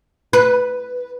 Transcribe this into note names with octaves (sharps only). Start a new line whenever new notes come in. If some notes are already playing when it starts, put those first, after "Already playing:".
B4